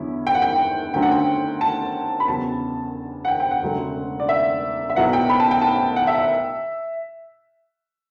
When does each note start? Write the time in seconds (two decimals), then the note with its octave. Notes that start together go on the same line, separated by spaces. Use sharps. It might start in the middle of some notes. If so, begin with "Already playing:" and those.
Already playing: E2 D3 F#3 C#4 E4
0.27 G5
0.35 F#5
0.42 G5
0.94 D2 D3 F#3 C#4 G5
1.02 F#5
1.11 G5
1.61 A5
2.20 B5
2.28 E2 C#3 F#3 A5
3.25 F#5
3.28 G5
3.40 G5
3.51 F#5
3.62 E1 D2 C#3 F#3 A3
4.20 D5
4.29 E5
4.90 E5
4.96 B1 B2 F#3 B3 E4 F#5
5.13 G5
5.29 B5
5.40 A5
5.51 G5
5.62 A5
5.96 F#5
6.07 E5
6.18 E5